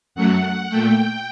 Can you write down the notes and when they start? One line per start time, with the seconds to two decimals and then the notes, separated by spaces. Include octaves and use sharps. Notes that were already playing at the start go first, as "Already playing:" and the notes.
0.15 F#2 F#3 A3 F#5
0.70 A#2 A3 G5